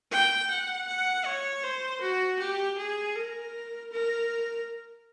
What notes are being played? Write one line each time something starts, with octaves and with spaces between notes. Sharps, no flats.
G5
F#5
F#5
C#5
C5
F#4
G4
G#4
A#4
A#4